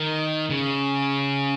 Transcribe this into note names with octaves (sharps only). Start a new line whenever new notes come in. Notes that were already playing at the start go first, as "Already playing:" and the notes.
Already playing: D#3
C#3